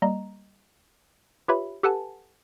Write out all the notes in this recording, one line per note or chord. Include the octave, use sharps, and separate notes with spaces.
G3 A#3 D#5 A#5
F4 G4 B4 C#5 E5 B5
G4 A4 B4 F#5 G#5 A5